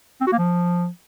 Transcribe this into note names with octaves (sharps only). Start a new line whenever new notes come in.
C4
F#4
A#3
F3